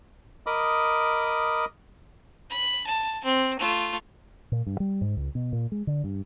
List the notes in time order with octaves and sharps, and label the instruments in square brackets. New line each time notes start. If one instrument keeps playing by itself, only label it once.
[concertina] A#4 D#5 B5 D6 D#6
[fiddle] B5
A5
C4
A3 F4
[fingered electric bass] A#2
G2
G3
G#2
C#2
B2
A#2
G#3
D3
G2